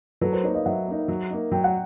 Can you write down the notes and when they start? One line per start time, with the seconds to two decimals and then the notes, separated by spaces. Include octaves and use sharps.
0.21 F#3 A4 B4
0.33 A#4 C5
0.43 A#3 D#4 B4 C#5
0.54 D#5 F5
0.65 F#3 E5 F#5
0.87 A#3 D#4
1.08 F#3
1.30 A#3 D#4
1.52 F#3 G5
1.64 F#5